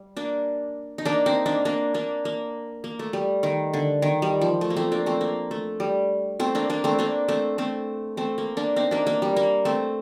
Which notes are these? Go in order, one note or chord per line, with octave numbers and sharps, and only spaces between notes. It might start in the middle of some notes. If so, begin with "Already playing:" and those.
Already playing: G3
A#3 D4
D#4
A#3 D4
C4 D#4
A#3 D4
A#3 D4
A#3 D4
A#3
A#3
A3
G3
D#3
D3
D#3
G3
F3
A3
A#3
A3 C4
A#3 D4
A3 C4
A#3
A3
G3
A3 C4
A#3 D4
A#3 D4
A3 C4
A#3 D4
A3 C4
A3 C4
A3 C4
A#3
A#3 D4
C4 D#4
A#3 D4
A#3
G3
A#3
A3 C4